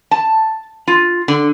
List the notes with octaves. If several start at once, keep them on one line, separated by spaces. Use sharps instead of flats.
A5
F4
D3